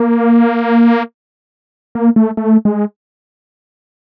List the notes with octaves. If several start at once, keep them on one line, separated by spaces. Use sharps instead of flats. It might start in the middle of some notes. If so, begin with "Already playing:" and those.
Already playing: A#3
A#3
A3
A3
G#3